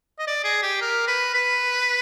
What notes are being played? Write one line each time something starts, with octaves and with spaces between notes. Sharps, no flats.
D#5
D5
G#4
G4
A#4
B4
B4